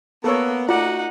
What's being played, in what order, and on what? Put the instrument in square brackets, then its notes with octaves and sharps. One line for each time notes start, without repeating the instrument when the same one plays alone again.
[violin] A#3 [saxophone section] B3 [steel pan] A4 C#5
[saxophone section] A3 F#4 [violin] D#4 F#5 [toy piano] F4 [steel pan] D5